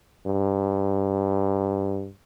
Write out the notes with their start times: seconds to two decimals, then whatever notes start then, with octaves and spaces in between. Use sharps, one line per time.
0.26 G2